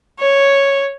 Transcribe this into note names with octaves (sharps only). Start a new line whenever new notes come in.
C#5